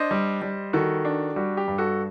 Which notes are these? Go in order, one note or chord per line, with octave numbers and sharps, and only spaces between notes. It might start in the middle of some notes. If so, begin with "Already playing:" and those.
Already playing: D4 C5 D#5
G3
G3
D#3 F#4 A4
D4
G3 F#4
G4
G2
F#4 A4